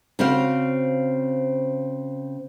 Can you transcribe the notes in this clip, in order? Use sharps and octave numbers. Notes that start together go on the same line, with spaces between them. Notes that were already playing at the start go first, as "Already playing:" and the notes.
C#3 C4 F#4 C5 F5